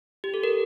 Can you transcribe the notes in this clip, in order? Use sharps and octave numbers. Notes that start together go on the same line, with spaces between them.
G4
A4
A#4